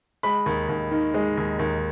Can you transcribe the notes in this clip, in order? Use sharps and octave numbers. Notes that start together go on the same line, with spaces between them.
G#3 B5
D#2
D#2
D#3
G#3
D#2
D#2